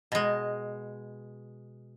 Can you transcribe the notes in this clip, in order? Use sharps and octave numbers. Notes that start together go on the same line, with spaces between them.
B2 G#3